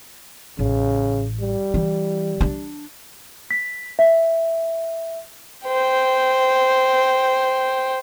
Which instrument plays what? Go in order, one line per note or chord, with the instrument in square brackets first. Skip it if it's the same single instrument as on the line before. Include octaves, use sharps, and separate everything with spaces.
[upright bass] A1 [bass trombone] C#3
[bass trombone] G3
[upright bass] E3
D4
[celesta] B6
E5
[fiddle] C5 G5